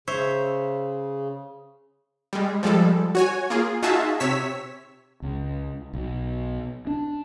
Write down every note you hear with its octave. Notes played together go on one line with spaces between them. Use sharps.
C#3 C5 C#5 E5
G3 G#3
F3 G3 G#3 A4
F#4 C#5 G#5
A#3 F4 G#4
D#4 F4 F#4 G#4 E5 A5
C3 C#5 E6 B6
C#2
B1
D4